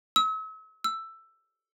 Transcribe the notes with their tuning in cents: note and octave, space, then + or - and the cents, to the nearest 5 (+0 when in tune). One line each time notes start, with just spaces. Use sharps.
E6 -40
E6 +10